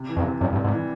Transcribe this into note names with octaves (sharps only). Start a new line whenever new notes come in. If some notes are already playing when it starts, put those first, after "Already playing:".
Already playing: C3
E3
F2
C3
F#2 G3
G2
C3
G#2
E3